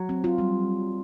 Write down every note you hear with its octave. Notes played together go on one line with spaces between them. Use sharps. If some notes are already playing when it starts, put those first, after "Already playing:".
Already playing: F#3
C4
F4
G3